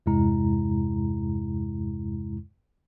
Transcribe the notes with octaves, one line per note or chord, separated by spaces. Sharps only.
E2 G2 C3 G#3 E4 A#5